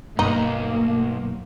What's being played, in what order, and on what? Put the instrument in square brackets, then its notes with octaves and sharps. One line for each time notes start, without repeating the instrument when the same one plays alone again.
[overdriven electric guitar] B1 [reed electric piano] G2 [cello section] A#3 [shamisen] D#4